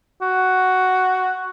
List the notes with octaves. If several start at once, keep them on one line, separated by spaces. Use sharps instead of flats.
F#4